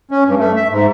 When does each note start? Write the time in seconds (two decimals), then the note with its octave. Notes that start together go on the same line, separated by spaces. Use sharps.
0.11 C#4
0.27 G2
0.39 A3
0.56 E5
0.71 G#2